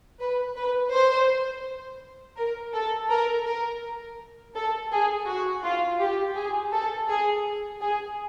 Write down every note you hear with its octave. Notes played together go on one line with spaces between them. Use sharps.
B4
B4
C5
A#4
A4
A#4
A#4
A4
G#4
F#4
F4
G4
G#4
A4
G#4
G#4